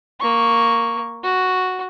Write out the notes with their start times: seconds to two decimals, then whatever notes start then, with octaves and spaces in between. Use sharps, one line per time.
0.20 A#3 C#6
1.23 F#4